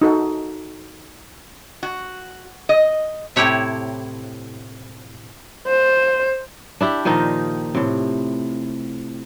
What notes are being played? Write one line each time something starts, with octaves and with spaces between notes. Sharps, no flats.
D#4 F#4 A4
F#4
D#5
A2 C3 E4 G4 C#5 E5
C5
D4 E4 G4
A#2 D#3 F3 D#4
A2 C3